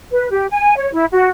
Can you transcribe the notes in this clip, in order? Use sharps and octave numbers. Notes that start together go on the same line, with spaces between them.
B4
G4
G#5
C#5
E4
F#4